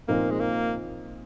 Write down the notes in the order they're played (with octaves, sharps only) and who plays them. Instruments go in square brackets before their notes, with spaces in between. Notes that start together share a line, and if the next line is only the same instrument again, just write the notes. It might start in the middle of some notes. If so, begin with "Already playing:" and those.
[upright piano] A#2 F3 C4 D#4 A#4 [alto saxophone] A#3
[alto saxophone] G#3
A#3